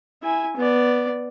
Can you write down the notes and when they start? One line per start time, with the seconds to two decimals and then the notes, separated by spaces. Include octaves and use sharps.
0.23 E4 G#5
0.57 B3 D5